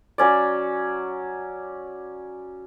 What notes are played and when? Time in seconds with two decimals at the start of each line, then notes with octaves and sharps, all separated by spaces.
0.18 F#3 C#4 D5